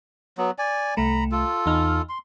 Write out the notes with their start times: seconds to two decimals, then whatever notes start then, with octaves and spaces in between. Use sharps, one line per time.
0.38 F#3 B3
0.58 D5 G#5
0.97 C2 A3 A#5 B5
1.32 F4 A4
1.66 E2 D#4 F6
2.09 C6